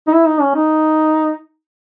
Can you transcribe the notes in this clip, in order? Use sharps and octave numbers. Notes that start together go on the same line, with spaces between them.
D#4
E4
D#4
C#4
D#4